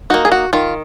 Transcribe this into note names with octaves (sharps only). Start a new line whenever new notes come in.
A#3 D#4 F#4
G#4
F#4
D#3 F4